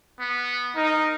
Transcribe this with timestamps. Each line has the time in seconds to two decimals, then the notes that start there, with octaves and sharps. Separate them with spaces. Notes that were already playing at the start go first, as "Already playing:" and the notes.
0.19 B3
0.77 D#4 A#4